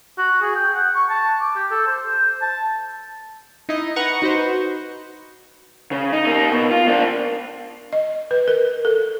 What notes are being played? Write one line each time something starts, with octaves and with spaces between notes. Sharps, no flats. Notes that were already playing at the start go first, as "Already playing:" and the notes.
F#4
G#4
G5
F#5
C#6
A5
D6
G4
A4
C5
A5
D#4 E4 D#5
B4 F#5 A#5 C#6
D#4 F#4 B4 C5
C#3
D#4
A#3 D#4
B2
F4
A#3 D4
D#5
B4
A#4
A4